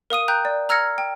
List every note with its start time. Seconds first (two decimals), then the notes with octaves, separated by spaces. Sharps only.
0.10 A#4 F5 D#6 D#7
0.28 G5 A#5 F#6 G6
0.45 D5
0.69 A#5 E6 F6 G#6 A#6 C#7
0.98 G5